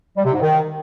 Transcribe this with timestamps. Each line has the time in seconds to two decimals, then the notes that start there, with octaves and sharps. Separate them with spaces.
0.17 G3
0.25 C3
0.33 G#2
0.41 D#3